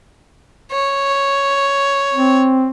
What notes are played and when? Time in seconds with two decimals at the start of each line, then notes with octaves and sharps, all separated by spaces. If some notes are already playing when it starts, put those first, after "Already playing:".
0.72 C#5
2.14 C4